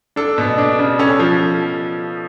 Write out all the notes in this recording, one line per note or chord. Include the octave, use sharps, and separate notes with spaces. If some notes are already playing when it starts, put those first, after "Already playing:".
D4 A4
B2
D4
C#3
C#4 A4
F3